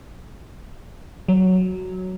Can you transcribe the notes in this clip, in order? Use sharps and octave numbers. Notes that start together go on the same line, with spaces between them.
F#3